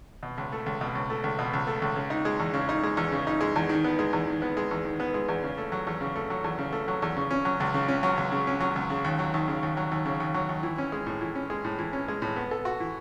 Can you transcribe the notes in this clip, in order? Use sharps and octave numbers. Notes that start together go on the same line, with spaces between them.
B2
C#2
A3
C#2
B2
C#2
A3
C#2
B2
C#2
A3
C#2
C#3
D#4
G#3
E2
C#3
D#4
G#3
E2
C#3
D#4
G#3
E2
D#3
B3
G#3
E2
D#3
B3
G#3
E2
D#3
B3
G#3
E2
C#3
A3
F#3
E2
C#3
A3
F#3
E2
C#3
A3
F#3
E2
C#3
C#4
F#3
C#2
C#3
C#4
F#3
C#2
C#3
C#4
F#3
C#2
C#3
D#2
F#3
D#2
C#3
D#2
F#3
D#2
C#3
D#2
F#3
D#2
E3
C#4
G#3
A2
E3
C#4
G#3
A2
E3
C#4
G#3
A2
B3
A4
F#4
E3